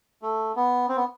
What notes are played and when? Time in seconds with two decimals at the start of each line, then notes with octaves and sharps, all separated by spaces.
0.22 A3
0.56 B3
0.89 C4
0.97 B3